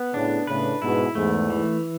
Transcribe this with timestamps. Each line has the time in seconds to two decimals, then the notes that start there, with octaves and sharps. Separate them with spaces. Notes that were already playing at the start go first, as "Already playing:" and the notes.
Already playing: B3
0.13 A2 C#3 D4
0.47 A2 C#3 B4
0.82 G#2 B2 E4
1.15 E2 G#2 A3
1.50 E3